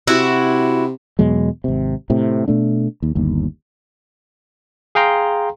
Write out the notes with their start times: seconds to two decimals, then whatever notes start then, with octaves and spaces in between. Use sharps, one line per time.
0.08 C3 E4 F#4
1.19 E2 B2 F#3 G#3
1.64 G#1 C3
2.10 A2 C3
2.48 B2 A3 D4
3.02 D#2
3.15 G1 D#2
4.95 G#4 F5 G5 A#5 C6